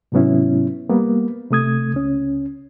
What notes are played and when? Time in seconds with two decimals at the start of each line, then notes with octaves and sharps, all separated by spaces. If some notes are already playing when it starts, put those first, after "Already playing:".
0.12 G#2 C3 F#3 B3 C#4 E4
0.89 G3 A#3 B3
1.51 C3 A3 D#6 G#6
1.94 C#2 C#4